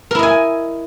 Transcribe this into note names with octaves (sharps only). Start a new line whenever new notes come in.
E4 A#4 D#5 G#5